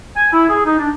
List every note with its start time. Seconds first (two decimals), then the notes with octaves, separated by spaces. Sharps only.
0.17 G#5
0.33 E4
0.50 G#4
0.66 D#4
0.79 D4